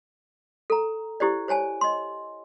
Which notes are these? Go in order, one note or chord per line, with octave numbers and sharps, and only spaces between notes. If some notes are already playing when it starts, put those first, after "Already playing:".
A4 A#5
E4 G4 C5 D5
C5 C#5 G#5 A5
D#5 C6